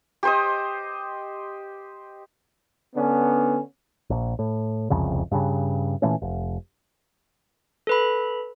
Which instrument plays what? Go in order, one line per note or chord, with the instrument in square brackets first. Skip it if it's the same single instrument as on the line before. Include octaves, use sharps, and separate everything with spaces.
[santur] G4 C5 D#5
[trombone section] D3 B3 C#4 D4
[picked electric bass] A#1
A2
E1 C2 F2 C#3
G2 C#3
A#2 E3 A3 C#4
F1
[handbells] A4 B4 B5